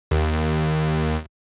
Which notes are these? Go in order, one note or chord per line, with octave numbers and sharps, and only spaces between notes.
D#2